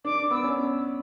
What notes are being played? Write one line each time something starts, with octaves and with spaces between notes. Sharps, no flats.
D4 D6
B3 E6
C#4